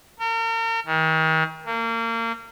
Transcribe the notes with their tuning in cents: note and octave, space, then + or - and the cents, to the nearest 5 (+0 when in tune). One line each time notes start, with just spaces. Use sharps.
A#4 -40
D#3 +40
A#3 -30